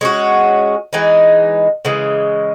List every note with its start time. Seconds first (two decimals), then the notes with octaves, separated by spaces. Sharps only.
0.01 G#3 C#4 F#4
0.93 E3 G#3 D#4
1.85 C#3 E3 G#3